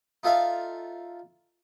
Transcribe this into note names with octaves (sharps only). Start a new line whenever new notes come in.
D#4 F4 A4 E5 F5